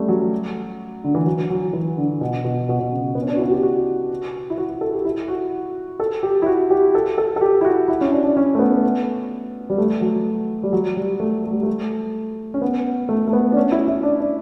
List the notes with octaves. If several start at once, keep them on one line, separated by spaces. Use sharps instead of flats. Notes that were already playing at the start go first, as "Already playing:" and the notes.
Already playing: G3 A3 C#4
F#3
D3
E3
F#3
F#3
E3
D3
B2
B2
B2
B2
C#3
B3
C#4
D4
F#4
E4
F#4
G4
F#4
E4
F#4
F#4
A4
G4
E4
F#4
A4
G4
E4
F#4
G4
A4
A4
A4
G4
E4
F#4
E4
C#4
D4
D4
C#4
A3
B3
G3
A3
F#3
G3
F#3
G3
A3
A3
G3
A3
C#4
B3
A3
A3
B3
D4
C#4
E4
E4
D4
D4